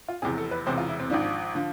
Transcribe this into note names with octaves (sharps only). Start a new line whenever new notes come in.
F4
F1 E2 C3 G#4
A4
B4
E1 E2 C3 E3 C5
F4
E4
C4
G#1 G#2 F3 D4
D3 F3